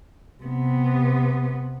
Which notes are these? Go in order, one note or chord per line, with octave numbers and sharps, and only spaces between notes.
C3 B3